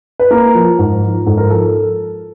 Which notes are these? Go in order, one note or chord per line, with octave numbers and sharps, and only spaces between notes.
B4
A#3 A#4
F3
G#2
F3
G#2 A4
A#4
F3 A4